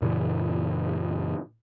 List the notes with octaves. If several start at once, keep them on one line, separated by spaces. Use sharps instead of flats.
F#2 A#2 C#3 E3